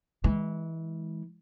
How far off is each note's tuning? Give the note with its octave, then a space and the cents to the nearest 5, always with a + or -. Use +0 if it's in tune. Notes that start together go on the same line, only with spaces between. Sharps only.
E3 -25 G#3 +0